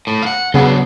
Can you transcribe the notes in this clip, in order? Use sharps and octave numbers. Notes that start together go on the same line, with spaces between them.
A2
F5 F#5
C#3 F#3 B3 D4